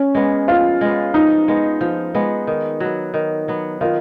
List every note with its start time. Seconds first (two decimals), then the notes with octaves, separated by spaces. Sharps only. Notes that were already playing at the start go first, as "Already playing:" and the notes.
Already playing: C#4
0.15 G#3 B3
0.48 F3 F4
0.81 G#3 B3
1.14 F3 D#4
1.48 G#3 B3
1.81 F3
2.15 G#3 B3
2.47 D#3
2.80 F#3 B3
3.14 D#3
3.48 F#3 B3
3.81 D#3 F4